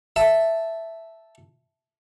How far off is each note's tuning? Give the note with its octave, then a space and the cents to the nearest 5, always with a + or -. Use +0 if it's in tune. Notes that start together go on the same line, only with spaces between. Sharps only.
E5 +0 A5 +0